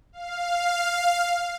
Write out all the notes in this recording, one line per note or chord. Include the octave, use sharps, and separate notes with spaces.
F5